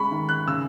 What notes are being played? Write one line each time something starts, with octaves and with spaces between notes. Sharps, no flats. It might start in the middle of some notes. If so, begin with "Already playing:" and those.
Already playing: G#3 C#4 B5 C#6
D#3
F#6
C#3 E6